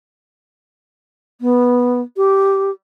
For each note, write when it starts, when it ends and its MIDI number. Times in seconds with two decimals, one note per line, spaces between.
1.41 2.01 59
2.16 2.70 67